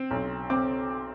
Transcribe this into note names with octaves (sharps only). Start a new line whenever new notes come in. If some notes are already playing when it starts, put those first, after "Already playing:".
Already playing: C4
B1
C4 D6